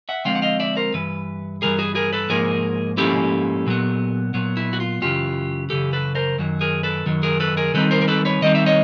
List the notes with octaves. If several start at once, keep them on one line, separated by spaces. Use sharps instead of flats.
E5 F#5
D3 F3 G#3 C4 F5 G5
F#5
D#5 F5
D5 E5
A#4 C5
G2 E3 B4
G2 E3 G3 G#4 A#4
F#4 G#4
G#4 A#4
A4 B4
G#2 F3 A#3 G#4 A#4
G#2 F3 A#3 C#4 E4 G4 A4
A#2 F#3 B3
A#2 F#3 B3
E4
F#4
F4
F#2 C#3 E3 F4 G4
F#2 C#3 E3 G4 A4
A4 B4
A#4 C5
F#2 D#3 F#3
G#4 A#4
A4 B4
F#2 D#3 F#3
G#4 A#4
A4 B4
G#4 A#4
D#3 G3 C4 D#4 A4 B4
A#4 C5
A#4
A4 B4
B4 C#5
D#3 G3 C4 D#4 D#5
E5
C#5 D#5